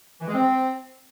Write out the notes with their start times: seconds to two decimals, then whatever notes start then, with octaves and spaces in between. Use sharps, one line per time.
0.21 E3
0.28 G#3
0.34 C4